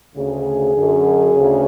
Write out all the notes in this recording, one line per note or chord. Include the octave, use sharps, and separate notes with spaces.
D2 C#3 G#4
F#2 D3
D2 C#3